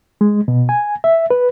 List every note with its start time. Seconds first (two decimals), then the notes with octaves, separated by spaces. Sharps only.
0.21 G#3
0.48 B2
0.69 G#5
1.04 E5
1.30 B4